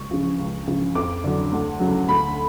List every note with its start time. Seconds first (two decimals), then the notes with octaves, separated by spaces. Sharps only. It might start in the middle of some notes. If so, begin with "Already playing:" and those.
Already playing: C#2 C#6
0.11 C#3 F3
0.39 C#2
0.68 C#3 F3
0.95 F2 D6
1.24 D3 F#3
1.52 D2
1.80 C#3 F#3
2.09 D2 B5